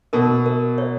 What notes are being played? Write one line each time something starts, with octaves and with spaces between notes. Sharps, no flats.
B2 A#4
A#4
C#5